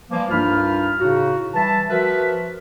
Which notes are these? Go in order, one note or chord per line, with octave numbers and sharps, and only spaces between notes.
E3 F3 G3 A#3
C2 G2 D#4 F4 B5 F6
A2 C#3 D#4 F#4
E3 G3 E5 A5
F3 F#4 A#4 B4 E5